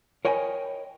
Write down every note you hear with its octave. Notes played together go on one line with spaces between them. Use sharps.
A#4 C#5 D#5 G5 G#5 B5